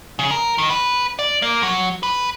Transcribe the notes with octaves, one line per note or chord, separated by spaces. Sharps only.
C#3
A#4
D#3
B4
D5
A#3
F#3
B4